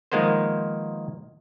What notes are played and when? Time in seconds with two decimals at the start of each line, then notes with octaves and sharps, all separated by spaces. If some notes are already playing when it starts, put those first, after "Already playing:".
0.12 D#3 F3 G#3 A#3 B3 C5